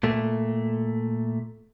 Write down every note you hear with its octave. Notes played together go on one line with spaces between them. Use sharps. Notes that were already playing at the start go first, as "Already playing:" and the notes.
A#2 A3